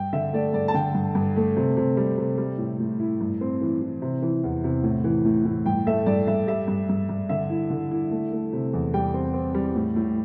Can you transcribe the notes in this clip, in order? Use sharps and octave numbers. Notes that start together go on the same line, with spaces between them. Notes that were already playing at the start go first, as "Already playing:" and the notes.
Already playing: G2 G5
D3 E5
A3 D5
G2 D5
A5
D3 G5
G2
G2
A3
C3
C3
G3
C3
G3
A2
A2
E4
G2
C4
E3
E3
C3
E3
E2
C3
A2
E3
A2
A2
G2 G5
A3 E5
G2 D5
G2 E5
G3 E5
G2
G2
G2
D3 E5
E4
D3
E4
A3
A3
C3
E2
G3 G5
C4
C4
G3
A2
A2